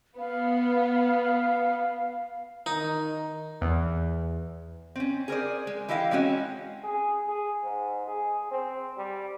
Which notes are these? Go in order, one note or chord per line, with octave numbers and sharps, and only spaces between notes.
B3 F5
D#3 D#4
E2
C4 C#4
G#4 A#4 C5 D5
G#3
E3 E4 G4 D#5 F5 G5
G#3 C4 C#4 F#4
G#4
G#4
G#2
G#4
C4
G3